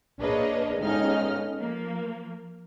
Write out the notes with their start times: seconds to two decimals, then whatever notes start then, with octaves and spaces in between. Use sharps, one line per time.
0.21 A#3 D4 G#4 B4 C#5 D#5
0.80 G1 G#3 C#4 D#4 D#5 F6
1.60 F3 A#3